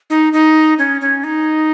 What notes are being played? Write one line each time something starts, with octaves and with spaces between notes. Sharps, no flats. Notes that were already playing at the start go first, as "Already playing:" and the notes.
D#4
D#4
C#4
C#4
D#4